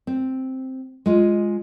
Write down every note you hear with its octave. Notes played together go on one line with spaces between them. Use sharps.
C4
G#3 F4 D#5